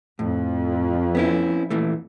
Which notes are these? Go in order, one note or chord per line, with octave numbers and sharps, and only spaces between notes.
F2 A2
B3 C#4 E4
A#2 E3 A3